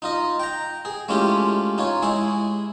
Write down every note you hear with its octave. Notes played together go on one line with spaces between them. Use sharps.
D#4 F4 D#5
G5 A#5
G#4
G#3 A3 C#4 E4 F4 G4
D#4 F4 C#5
G#3 E4 G#4